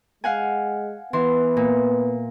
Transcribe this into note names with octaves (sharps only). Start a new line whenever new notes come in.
G#3 F5 F#5 G#5
E3 B3 C6
A#2